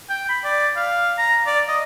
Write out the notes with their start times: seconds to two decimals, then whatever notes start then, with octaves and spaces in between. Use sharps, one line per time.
0.09 G5
0.29 B5
0.44 D5
0.76 F5
1.18 A#5
1.47 D5
1.68 D#5